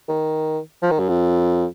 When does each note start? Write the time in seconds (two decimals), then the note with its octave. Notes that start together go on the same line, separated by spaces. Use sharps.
0.09 D#3
0.82 F3
0.91 D#3
0.99 F#2
1.09 F2